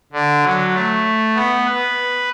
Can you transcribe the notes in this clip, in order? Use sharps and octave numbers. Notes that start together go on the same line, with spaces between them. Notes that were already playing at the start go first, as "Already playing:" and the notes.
D3
F#3
A3
B3
B4